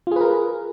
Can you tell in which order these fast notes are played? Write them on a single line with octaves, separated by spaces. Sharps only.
F4 G#4 B4 A#4